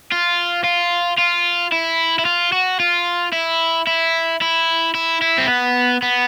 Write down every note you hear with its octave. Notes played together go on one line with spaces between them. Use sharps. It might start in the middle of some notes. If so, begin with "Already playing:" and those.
F4
F4
F4
E4
E4
F4
F#4
F4
E4
E4
E4
E4
E4
C4
B3
B3